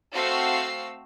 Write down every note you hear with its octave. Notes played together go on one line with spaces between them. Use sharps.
A3 C4 F#4 F5 E6 C7